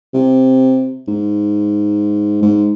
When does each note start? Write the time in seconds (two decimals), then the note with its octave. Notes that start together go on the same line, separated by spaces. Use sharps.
0.14 C3
1.08 G#2
2.42 G#2